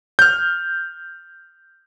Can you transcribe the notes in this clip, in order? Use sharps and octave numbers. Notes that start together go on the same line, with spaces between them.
F6 G6